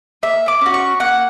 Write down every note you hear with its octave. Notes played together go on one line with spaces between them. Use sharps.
A#3 E5
D6
C#4 F#4
C#6
A#3 F#5